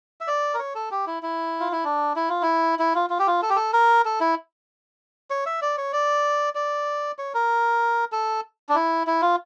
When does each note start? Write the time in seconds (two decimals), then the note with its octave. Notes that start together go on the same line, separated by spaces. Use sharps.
0.21 E5
0.27 D5
0.54 A#4
0.59 C#5
0.75 A4
0.91 G4
1.07 E4
1.23 E4
1.60 F4
1.72 E4
1.85 D4
2.16 E4
2.29 F4
2.42 E4
2.79 E4
2.95 F4
3.10 F4
3.19 G4
3.27 F4
3.42 A4
3.50 G4
3.56 A4
3.73 A#4
4.05 A4
4.21 E4
5.30 C#5
5.46 E5
5.62 D5
5.78 C#5
5.93 D5
6.55 D5
7.18 C#5
7.34 A#4
8.12 A4
8.69 D4
8.75 E4
9.07 E4
9.22 F4